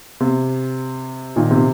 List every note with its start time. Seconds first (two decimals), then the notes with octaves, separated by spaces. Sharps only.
0.20 C3
1.36 A#2 D#3
1.51 C3